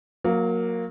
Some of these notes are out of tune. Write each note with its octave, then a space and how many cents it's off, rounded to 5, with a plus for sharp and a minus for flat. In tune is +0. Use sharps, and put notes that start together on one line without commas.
F#3 -20 A#3 +0